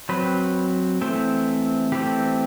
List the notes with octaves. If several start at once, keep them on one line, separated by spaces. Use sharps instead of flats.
F#3 C4 B4
E3 A3 C4
E3 A3 C4 G4